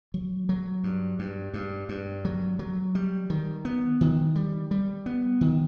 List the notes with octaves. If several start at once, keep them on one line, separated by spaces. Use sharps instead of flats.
F#3
F#3
G2
G2
G2
G2
F#3
F#3
G3
D#3
B3
D#3
G3
G3
B3
D#3